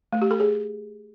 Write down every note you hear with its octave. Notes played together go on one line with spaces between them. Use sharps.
A3
G4
A4
G#4